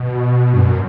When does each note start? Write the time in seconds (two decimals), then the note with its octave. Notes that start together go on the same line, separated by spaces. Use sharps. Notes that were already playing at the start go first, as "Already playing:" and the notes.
Already playing: B2
0.53 G2
0.60 F#2